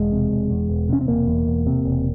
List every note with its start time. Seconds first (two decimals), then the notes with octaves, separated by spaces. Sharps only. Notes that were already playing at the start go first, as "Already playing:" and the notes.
Already playing: E1 G#3
0.12 C3
0.31 E1
0.50 E2
0.69 E1
0.89 C3 C#4
1.01 C4
1.08 E1 A#3
1.27 E2
1.47 E1
1.67 C3
1.85 E1